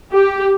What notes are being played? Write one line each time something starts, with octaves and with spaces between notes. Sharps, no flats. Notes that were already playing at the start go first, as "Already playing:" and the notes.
G4